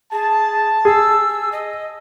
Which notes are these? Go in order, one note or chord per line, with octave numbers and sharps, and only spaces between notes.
G#4 A5
G#4 E6
D#5